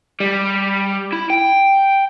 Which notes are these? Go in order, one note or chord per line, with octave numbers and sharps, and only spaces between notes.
G3
E4
G5